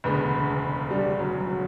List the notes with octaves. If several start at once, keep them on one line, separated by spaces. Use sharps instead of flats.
E1 D2 C#3 B3
G3
F#3
F#3